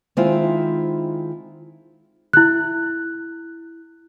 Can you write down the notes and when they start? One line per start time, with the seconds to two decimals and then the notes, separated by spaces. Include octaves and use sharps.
0.17 D#3 G#3 C4 E4 F4
2.33 E4 F#6